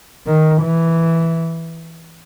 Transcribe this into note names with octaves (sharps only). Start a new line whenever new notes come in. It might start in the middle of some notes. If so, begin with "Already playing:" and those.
D#3
E3